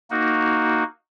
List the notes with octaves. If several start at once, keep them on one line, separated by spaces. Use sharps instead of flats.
A#3 D#4 F#4